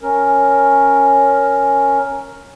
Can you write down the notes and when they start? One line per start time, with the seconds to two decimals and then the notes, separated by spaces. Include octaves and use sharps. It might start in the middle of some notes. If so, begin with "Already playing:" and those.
0.03 C#4 A#4